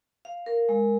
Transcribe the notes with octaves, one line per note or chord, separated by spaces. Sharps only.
F5
A#4
G#3